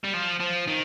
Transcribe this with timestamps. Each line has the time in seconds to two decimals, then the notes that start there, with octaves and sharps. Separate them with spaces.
0.04 G3
0.13 F3
0.40 F3
0.67 D#3